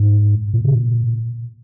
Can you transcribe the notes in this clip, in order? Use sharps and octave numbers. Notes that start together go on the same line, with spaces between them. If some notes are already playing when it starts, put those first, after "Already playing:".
Already playing: G#2
A#2
C#3
A#2